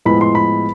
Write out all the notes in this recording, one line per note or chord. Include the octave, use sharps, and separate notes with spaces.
A2 F3 G#3 B3 B5
C6
B5